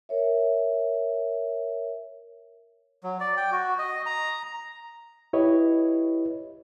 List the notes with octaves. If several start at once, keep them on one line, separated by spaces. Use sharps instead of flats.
A#4 C#5 E5
F#3
D5
G5
F#4
D#5
A#5
E4 G4 B4 C#5 D#5